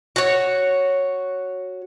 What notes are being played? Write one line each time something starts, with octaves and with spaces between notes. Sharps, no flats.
F#4 C#5